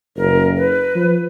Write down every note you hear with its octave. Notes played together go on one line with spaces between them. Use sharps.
F#1 A#4
B4
F3